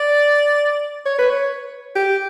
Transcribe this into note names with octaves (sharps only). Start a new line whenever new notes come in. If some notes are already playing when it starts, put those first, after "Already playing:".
Already playing: D5
C#5
B4
C#5
G4